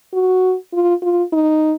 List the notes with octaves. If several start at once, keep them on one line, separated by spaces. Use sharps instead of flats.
F#4
F4
F4
D#4